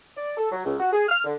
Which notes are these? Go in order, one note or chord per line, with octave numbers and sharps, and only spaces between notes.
D5
A4
F#3
C#2
F#4
G#4
F6
D3